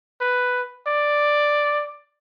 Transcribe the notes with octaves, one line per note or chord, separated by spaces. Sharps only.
B4
D5